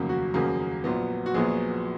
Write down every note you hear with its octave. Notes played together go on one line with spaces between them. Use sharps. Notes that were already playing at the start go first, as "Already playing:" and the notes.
Already playing: F1 D#2 C#3 F#3 A#3
F#4
F1 D#2 C#3 F#3 A#3 G#4
A#1 A#2 F#3 B3
F#4
A#1 A#2 F#3 B3 G#4